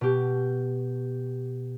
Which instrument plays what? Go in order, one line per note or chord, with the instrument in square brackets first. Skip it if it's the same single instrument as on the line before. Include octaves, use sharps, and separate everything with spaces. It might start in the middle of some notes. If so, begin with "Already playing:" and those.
[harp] B2 G4